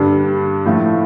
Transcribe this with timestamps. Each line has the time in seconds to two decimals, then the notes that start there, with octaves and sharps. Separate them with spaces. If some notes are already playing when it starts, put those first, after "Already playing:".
Already playing: G2 D3 G3 D4
0.65 A2 F3 A3